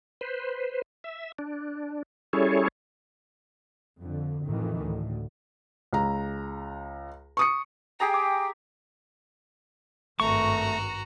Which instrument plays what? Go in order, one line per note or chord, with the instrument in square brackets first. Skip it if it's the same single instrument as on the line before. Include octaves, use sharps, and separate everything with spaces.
[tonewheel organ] B4 C5
E5
D4
G3 C#4 E4 G#4 A4 C#5
[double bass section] F2 D3
A1 F2 D#3 E3
D2 A2
[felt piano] C#2 A#5
C#6 D#6 C#7
[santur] G4 G#4 A#5 [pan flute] G5
[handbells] D6
[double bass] G#1 G2 [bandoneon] A3 [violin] F#4 A#5 [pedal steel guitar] C#6